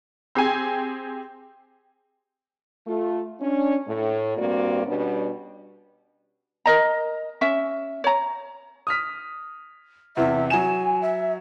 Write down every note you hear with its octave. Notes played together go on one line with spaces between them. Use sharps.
C4 G4 G#4 G#5
A3 F4
C#4 D4
A2
G2 A#3 C4 F#4 D5
B2 G3 B3 C#4 D4
A#4 D#5 A#5
C#4 E5
C#5 A#5
D#6 F6 B6
E2 C3 E3 E5
F#3 G#5 E7
E5